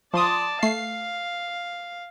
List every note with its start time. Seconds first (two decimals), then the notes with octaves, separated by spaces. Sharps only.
0.14 F3 D5 A5 C6 D#6
0.63 A3 F5 C7